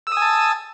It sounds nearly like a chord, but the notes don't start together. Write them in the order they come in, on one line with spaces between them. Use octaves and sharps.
E6 D#6 G#5 A5